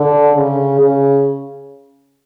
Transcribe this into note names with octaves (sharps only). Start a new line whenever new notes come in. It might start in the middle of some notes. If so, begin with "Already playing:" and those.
Already playing: D3
C#3
C#3